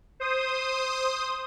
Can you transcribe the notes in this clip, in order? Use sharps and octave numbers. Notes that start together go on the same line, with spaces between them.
C5 D#6